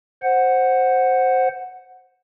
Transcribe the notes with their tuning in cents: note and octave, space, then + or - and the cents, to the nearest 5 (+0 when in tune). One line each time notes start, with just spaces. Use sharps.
C5 +5 F#5 +0